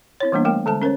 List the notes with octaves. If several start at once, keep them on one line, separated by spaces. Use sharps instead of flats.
C4 E4 C#5
E3 G3 A#3 B3 D4
G3 A3 A#4 G5
D3 G#3 A4 C5 A5
C#4 A#4 C5 C#5